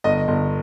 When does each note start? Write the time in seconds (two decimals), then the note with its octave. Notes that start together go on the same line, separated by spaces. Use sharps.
0.04 G1 D#5
0.28 G1